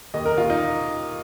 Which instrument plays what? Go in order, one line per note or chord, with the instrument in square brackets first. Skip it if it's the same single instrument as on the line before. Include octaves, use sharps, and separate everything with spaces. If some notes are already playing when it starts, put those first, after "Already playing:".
[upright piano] D#2 D#5
A#4
D#2 F4
D#4